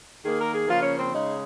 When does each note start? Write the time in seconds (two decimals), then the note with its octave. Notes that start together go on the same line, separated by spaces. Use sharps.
0.23 D#3 A#3 G#4
0.38 A#4
0.53 G#4
0.68 C#3 F3 A#3 F4
0.82 C#4
0.97 C4
1.12 C#3 G#3 D#4